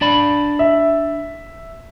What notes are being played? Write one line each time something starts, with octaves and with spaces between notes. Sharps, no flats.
D4 D5 B5
E5